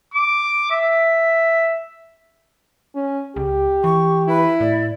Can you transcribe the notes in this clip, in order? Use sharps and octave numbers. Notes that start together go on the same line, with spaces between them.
D6
E5
C#4
C#2 G4
E3 C#6
E4 B4
A2 D5